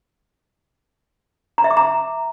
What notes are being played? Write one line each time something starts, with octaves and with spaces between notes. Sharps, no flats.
A#5
E5
D6
A#5